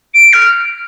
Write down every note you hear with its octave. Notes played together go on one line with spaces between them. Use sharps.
D7
F6